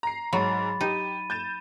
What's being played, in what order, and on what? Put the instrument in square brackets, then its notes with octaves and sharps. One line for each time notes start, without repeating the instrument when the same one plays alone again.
[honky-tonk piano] A#5 C7
[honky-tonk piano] G#2 [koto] F#3 [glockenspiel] B5 A6
[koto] D#4 [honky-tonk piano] G4 [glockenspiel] D#7
[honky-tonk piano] G6 A6 E7